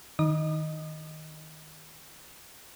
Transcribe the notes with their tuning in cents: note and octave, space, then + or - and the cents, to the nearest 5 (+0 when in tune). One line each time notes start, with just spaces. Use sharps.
D#3 +0 D#5 +0 D#6 -45